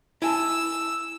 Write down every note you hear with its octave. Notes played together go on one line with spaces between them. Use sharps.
E4 G#5 A5 E6